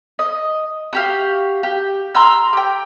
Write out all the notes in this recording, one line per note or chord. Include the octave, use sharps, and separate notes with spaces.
D#5
F#4 G4 F5
G4
A#5 C6 E6 F6
G4 G5